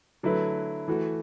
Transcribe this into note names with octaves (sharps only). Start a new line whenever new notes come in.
D3 F#3 A3 E4 B4
E3 A3 F#4